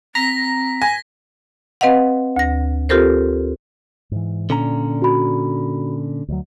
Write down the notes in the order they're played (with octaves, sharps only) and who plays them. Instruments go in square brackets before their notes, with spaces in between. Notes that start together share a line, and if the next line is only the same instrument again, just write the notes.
[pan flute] C4 [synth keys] A#5 [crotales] A#6 B6
[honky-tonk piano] G#5 [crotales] A#6
[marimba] C4 B4 D#5 F5 F#5
D2 A#6
C4 F4 G4 A4 A#4 C5
[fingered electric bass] G#2 E3
[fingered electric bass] A#2 [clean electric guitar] D3 C#4 A#5
[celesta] F#4 B5
[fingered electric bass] D2 F#3